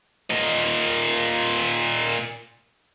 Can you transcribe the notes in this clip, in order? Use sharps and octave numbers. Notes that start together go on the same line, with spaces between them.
A#2 D#5